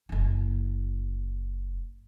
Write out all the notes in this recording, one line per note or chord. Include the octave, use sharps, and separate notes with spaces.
F#1 E4